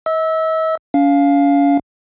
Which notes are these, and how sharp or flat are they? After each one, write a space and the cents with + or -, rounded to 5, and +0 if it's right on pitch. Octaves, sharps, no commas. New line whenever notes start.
D#5 +45 E6 -15
C#4 +40 F5 +0